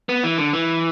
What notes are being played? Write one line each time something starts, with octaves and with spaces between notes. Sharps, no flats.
B3
E3
D3
E3